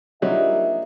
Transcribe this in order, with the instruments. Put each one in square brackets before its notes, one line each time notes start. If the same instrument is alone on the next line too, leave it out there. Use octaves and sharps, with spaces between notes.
[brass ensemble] A#1 E5 [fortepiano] C3 F#3 G3 [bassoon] D#4